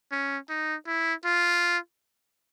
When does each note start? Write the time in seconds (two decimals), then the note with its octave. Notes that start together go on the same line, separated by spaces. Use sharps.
0.11 C#4
0.49 D#4
0.87 E4
1.25 F4